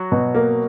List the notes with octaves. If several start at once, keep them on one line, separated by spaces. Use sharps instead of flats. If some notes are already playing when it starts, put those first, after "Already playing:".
Already playing: F#3 F#4
B2
A#3